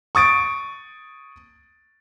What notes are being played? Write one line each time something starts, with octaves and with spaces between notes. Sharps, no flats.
C#6 D#6 A6 D7